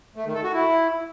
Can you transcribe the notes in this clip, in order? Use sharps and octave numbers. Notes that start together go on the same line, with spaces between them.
A3
D#3
A4
F#4
E4